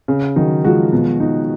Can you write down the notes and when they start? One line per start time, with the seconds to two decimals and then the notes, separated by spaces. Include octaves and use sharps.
0.08 C#3
0.36 D#3 F#3 D#4
0.64 F3 G#3 F#4
0.92 B2
1.20 D#4